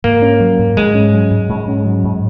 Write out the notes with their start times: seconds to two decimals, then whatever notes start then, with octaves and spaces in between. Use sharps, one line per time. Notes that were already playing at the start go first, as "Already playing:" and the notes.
0.04 G#2 A#3
0.22 C#4
0.40 F#3
0.59 G#2
0.77 G#2 G#3
0.95 C#4
1.13 F#3
1.31 G#2
1.49 G#2
1.68 C#4
1.85 F#3
2.04 G#2